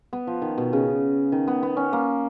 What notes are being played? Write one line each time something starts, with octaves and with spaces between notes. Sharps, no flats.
B3
F3
D#3
B2
C#3
D#3
B3
B3
C#4
A#3